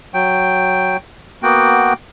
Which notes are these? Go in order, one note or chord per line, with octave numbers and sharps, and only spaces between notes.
F#3 G5
A#3 B3 F#4 G5